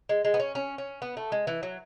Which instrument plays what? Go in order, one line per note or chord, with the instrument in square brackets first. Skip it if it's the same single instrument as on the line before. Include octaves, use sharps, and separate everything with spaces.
[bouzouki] G#3
G#3
B3
C#4
C#4
C#4
B3
A3
G#3
E3
F#3